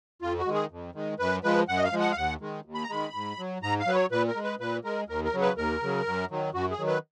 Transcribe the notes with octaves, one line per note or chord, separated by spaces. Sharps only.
F2 F4
F#4
D#3 G#3
G#4
F2
D#3 G#3
F#2 B4
F3 G#3 B4
F#2 F#5
D#5
F5
F3 G#3
F#5
F5
D#2 F#5
D#3 G#3
D#2
B5
A#5
D#3 G#3 B5
G#2
F#3
G#2 A#5
F5
F#3 B4
C#5
A#2 B4
A#4
G#3
B4
A#2 B4
G#3 A#4
D#2 A#4
A#4
C#3 F#3
B4
D#2 A#4
C#3 F#3
F#2
D#3 F#3
F#2 F#4
G#4
D#3 F#3
B4